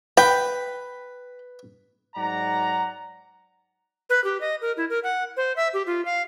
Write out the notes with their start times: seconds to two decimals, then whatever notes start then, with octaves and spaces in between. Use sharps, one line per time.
0.17 B4 G5
2.16 G#2 F#3 D5 F#5 A#5
4.10 B4
4.24 G4
4.41 D#5
4.62 A#4
4.77 E4
4.90 A#4
5.04 F#5
5.37 C5
5.56 E5
5.74 G4
5.87 F4
6.05 F5